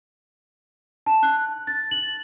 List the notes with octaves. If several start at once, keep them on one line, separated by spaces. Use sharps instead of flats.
A5
F#6
A6
F#7